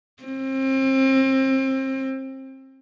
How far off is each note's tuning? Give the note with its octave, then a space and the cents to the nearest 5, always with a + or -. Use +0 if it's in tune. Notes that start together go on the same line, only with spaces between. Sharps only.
C4 +30